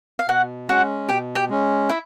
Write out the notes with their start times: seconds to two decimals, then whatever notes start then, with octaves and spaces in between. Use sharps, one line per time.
0.19 F5
0.28 B2 F#4 F#5
0.68 G#3 C#4 F#4 F#5
1.09 B2 G4 G5
1.35 G4 G5
1.49 G#3 C#4
1.89 E4 E5